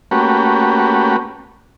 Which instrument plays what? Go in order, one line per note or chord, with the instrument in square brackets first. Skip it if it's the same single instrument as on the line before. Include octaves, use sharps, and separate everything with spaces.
[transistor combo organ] A3 A#3 C#4 F#4 G4 B4